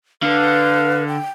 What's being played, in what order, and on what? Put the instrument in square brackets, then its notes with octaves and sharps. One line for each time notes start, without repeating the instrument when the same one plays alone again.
[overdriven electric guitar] D3 [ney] B4 [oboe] F5
[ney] G5